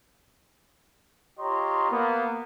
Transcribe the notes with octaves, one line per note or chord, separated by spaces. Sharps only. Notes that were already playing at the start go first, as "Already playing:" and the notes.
F4 G4 C#5 D#5 A#5 C6
A#3 B3